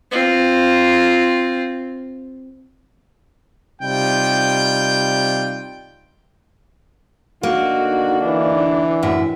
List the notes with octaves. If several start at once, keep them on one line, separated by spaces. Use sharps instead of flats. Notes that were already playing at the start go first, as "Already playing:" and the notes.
C4 F4
C3 G3 D#4 F4 G5
D3 A#3 D#4 F#4
E3 D4
F#2 A2 C#3 E4 E5